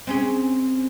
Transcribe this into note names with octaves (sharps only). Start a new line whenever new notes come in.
C4 C#4 G#4